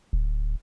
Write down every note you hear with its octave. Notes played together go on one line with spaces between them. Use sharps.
D1